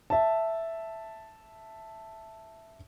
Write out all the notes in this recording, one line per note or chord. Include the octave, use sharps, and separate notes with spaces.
E5 A5